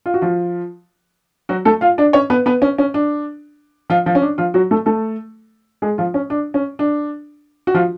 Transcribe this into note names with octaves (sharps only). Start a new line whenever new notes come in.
F4
F#4
F3 F4
F#3 F#4
A3 A4
F4 F5
D4 D5
C#4 C#5
B3 B4
B3 B4
C#4
C#4
D4
F3 F4
F3 F4
C#4
D4
F3 F4
F#3 F#4
A3 A4
A3 A4
G#3 G#4
F3 F4
C#4
D4
C#4
D4
F#4
F3 F4